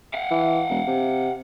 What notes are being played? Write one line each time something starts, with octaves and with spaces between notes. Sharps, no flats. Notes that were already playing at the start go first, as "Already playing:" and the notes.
F5 F#5
E3
E1
C3